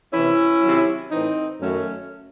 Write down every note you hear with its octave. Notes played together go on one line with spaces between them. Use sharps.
C3 E3 C#4 E4
C3 D#3 F#3
A2 E3 C4 D#4
F#2 D#3 F#3 A3 C#4